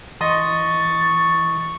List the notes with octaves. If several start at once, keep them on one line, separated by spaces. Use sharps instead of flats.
E3 D#5 C6 C#6 A6